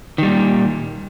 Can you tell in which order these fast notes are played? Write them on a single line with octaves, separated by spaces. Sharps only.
D#3 G3 A#2